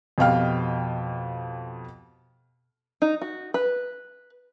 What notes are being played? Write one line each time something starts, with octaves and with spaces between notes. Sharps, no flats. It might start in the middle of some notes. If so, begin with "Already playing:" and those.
F2 B2 G4 F5 G5 F6
D#4
F#4
B4